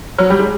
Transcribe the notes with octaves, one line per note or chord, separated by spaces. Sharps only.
F#3
G3
G#3